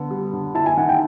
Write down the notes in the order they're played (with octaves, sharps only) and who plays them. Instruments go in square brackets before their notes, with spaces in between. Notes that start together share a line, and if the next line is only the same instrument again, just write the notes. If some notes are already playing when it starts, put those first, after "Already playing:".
Already playing: [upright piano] D3 B3
G3
D3
[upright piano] E4 [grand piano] A5
[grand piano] G#5
[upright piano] D#3 [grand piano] F#5
[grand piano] G5